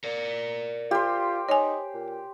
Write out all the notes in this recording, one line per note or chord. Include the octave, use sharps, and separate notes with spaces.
A#4 D5
F4 G4 C5
D#4 C#5 G#5
A#2